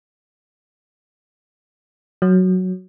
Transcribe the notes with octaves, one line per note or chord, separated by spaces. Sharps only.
F#3